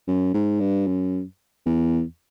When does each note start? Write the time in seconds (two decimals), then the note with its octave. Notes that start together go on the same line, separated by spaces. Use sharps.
0.08 F#2
0.34 G#2
0.60 G2
0.87 F#2
1.66 E2